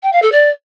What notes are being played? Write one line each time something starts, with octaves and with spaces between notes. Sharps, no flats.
G5
F5
A4
D5